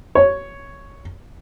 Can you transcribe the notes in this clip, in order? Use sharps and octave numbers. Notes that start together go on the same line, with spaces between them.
C#5